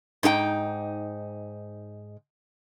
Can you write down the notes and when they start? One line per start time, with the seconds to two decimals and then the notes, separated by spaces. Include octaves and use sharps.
0.23 G#2 D#4 G#4 G5